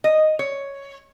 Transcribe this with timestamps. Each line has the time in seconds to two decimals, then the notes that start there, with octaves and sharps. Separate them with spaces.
0.04 D#5
0.39 C#5